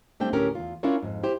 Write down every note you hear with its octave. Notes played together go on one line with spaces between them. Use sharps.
G3 A3 C4 D4 G5
D2 A2 D3 C#4 G4 A#4
E2 F4
C#4 D4 E4 F4 A#4 C#5
F2 G#2
E4 G4 C5